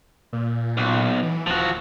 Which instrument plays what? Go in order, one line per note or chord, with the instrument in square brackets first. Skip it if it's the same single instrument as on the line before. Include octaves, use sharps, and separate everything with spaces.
[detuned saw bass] A#2
[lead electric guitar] B1
[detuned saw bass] E3
[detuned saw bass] D1 [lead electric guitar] F3 F#4